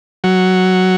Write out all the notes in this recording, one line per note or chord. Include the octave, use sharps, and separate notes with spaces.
F#3